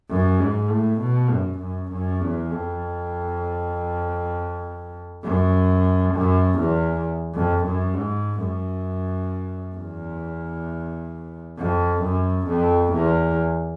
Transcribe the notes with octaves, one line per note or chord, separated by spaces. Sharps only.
F#2
G#2
A2
B2
F#2
F#2
F#2
E2
F2
F#2
F#2
E2
F2
F#2
G#2
F#2
E2
F2
F#2
F2
E2